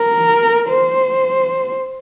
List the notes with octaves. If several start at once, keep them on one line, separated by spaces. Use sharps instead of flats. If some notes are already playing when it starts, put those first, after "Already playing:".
Already playing: A#4
C5